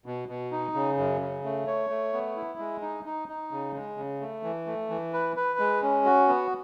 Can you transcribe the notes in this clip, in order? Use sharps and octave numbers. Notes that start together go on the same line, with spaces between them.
B2
B2
D#4
C#3
F#2
C#3
A3
C#5
A3
B3
E4
G#3
D#4
D#4
D#4
C#3
G#3
C#3
A3
E3
A3
E3
B4
B4
G#3
C#4
F#4
B3